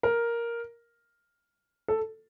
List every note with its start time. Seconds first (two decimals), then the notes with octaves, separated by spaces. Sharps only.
0.03 A#4
1.88 A4